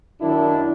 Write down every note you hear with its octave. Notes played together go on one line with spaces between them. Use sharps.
F#2 D#3 D4 E4